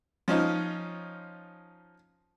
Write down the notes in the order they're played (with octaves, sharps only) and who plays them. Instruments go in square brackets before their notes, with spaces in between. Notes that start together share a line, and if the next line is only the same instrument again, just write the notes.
[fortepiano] F3 C#4 D#4 F4